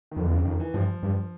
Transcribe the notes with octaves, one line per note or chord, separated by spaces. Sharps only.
D#3
F2 D3
E2
F2 C#3
F2 D#3
E3
G2 F3
G2